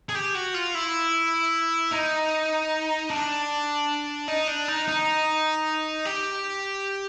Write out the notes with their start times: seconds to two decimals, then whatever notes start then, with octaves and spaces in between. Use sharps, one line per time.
0.09 G#4
0.15 G4
0.35 F#4
0.54 F4
0.75 E4
1.92 D#4
3.10 D4
4.28 D#4
4.47 D4
4.68 D#4
4.88 D#4
6.05 G4